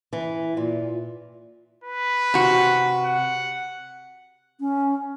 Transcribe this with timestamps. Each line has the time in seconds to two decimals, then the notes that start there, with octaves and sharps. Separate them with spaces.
0.13 E3
0.57 A#2
1.84 B4
2.34 C3 F#4
3.06 F#5
4.60 C#4